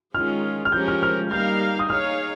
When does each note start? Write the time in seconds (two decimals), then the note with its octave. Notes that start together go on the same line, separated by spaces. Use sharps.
0.14 D#3 G#3 C#4 F4 G#4 F6
0.65 F6
0.72 F3 G#3 C#4 G4 A#4 G6
0.88 F6
1.03 F6
1.31 G3 A#3 D#4 A#4 F5 G6
1.79 D#6
1.90 D#4 G#4 C#5 F5 F6